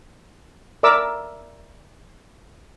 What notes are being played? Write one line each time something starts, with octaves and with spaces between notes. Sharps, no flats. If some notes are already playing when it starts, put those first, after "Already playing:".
A#4 D5 E5 D6 E6